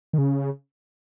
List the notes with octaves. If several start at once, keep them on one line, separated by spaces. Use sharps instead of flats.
D#3
C#3